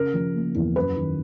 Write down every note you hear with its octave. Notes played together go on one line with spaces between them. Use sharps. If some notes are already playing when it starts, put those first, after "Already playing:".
Already playing: C#3 A#4
F3
A#3
E2
F#2 B4
D#3